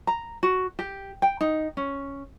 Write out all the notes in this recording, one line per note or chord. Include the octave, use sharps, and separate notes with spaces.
A#5
F#4
G4
G5
D#4
C#4